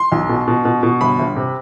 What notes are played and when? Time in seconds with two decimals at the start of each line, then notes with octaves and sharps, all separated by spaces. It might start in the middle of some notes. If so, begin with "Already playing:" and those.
Already playing: C6
0.12 B1
0.29 B2
0.48 B2
0.65 B2
0.83 B2
1.01 G1 B5
1.19 G1
1.36 C3